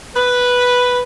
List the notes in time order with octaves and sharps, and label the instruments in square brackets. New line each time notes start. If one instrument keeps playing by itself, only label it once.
[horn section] B4